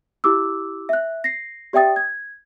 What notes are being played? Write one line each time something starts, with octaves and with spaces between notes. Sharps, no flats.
E4 G4 D6 E6
E5 F#6
A#6 C7
G4 D5 E5 G5 D#6 A6
G#6